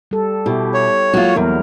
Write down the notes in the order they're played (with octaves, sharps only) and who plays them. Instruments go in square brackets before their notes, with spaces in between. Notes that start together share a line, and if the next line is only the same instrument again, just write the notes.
[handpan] G3 A4
[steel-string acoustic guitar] B2 [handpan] E4 G4
[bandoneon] C#5
[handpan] F#3 G#3 A#3 [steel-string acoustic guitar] F4 F#4
[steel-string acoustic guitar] E2 [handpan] G3 A#4